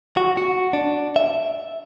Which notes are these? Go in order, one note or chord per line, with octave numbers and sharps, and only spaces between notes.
F#4
F#4
D4
E5